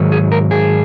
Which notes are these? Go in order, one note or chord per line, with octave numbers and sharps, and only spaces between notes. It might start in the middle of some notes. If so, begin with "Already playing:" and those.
Already playing: G#2 D#3 F#3
G#4
A#4
G#4